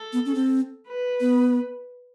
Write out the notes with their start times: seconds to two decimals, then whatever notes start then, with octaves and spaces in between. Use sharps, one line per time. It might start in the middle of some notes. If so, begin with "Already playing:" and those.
Already playing: A4
0.13 B3
0.26 C#4
0.35 C4
0.88 B4
1.20 B3